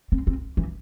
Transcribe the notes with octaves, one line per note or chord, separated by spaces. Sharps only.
C4
C4
E3